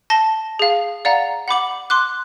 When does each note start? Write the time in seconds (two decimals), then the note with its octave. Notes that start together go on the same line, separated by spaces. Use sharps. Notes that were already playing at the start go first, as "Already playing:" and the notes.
0.10 A5 A#6 G7
0.59 G#4 F5
1.05 D5 F5 F#5 A#5
1.48 F#5 B5 D6 F#7
1.90 C6 D6 F#6